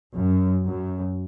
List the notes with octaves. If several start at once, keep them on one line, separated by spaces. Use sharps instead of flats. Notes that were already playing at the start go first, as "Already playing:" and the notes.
F#2
F#2